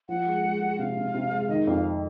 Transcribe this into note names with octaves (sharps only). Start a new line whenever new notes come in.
F3 F#5
G#3
G#3
G#3
C3 F5
C3
C3
G#3
D#3 D#5
F2 F5